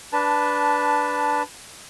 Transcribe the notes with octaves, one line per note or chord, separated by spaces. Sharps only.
D4 B4 A5